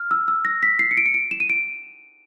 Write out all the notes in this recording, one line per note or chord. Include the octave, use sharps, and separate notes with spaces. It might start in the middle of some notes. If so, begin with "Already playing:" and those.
Already playing: F6
E6
E6
A#6
B6
C7
C#7
D7
C#7
D7
E7
D#7
D7